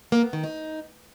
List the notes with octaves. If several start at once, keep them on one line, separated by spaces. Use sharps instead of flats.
A#3
B3
D#3
D#4